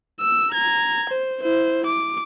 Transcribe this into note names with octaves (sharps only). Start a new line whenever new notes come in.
E6
A#5 G#6
C5
E4 C5
D6